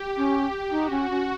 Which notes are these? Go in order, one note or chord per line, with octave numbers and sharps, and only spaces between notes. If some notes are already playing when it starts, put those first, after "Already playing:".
Already playing: G4
C#4
D#4 F#4
C#4
C#4